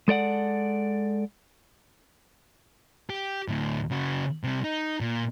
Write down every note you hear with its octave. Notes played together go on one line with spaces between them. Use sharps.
G#3 A4 D5 F#5
G4
D2 A2
C#3 F#4
C3 G3
D#4
A#2